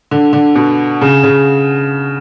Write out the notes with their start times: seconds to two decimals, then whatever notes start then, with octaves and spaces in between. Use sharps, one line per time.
0.11 D3
0.33 D3
0.56 B2
1.01 C#3
1.24 C#3